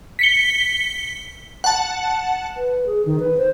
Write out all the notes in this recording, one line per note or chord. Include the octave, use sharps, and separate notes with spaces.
B6 C#7 G7
F#5 A5
B4
G#4
D#3
B4
C5